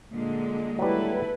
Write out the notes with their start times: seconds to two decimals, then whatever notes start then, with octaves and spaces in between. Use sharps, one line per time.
0.13 A#2 D3 G#3
0.79 F#3 G3 E4 A4 B4